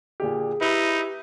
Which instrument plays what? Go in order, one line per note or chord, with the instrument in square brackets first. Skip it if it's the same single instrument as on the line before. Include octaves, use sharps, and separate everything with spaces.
[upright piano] A#2 D3 G4 [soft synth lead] G#4
[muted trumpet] D#4 [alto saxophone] E4 [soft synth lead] G4 [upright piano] B4